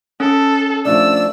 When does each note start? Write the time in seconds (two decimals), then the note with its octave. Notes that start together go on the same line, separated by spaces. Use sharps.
0.20 C#4 A4
0.85 F3 A3 D4 D5 E6